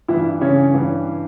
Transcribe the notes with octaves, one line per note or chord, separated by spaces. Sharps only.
G2 E3 E4
C#3 C#4
G2 E3